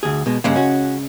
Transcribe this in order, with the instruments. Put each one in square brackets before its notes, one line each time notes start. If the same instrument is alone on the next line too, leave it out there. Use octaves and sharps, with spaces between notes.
[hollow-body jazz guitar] D2 G#4
B2 G#3
[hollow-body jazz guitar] G2 A#3 F5 [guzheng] C#3 G#3 F#5
[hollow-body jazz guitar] C#4 F#4